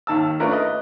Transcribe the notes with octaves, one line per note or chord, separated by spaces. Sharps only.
D#2 D#3 A5 E6
A3 C#4 D4 F4 A#4 B4
B4 D#5